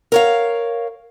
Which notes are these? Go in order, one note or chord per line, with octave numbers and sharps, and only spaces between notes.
A#4 C#5 F5